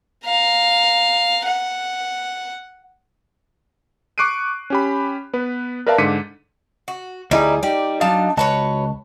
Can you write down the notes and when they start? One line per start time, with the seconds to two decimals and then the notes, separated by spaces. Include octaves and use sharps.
0.25 F5 A#5
1.45 F#5
4.18 C#6 D6 F#6 C7 D7 D#7
4.70 C#4 G4 B5
5.33 B3 B4
5.86 A#4 B4 D5 E5 F5 A5
5.98 G#2 D3 D6 B6 C#7 D#7
6.88 F#4
7.31 D2 G3 D#4 E4 G#4
7.63 G3 D#4 G4 D5
8.01 F#3 D4 D#4 F5 A5
8.37 C#2 F#4 B4 C#5 D#5 A5